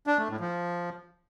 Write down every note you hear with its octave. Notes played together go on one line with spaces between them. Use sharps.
D4
A3
A2
F3